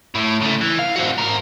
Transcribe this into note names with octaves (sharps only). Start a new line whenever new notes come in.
A2
C#3 A3
E3
F5
C4 F#4
G#2 A#4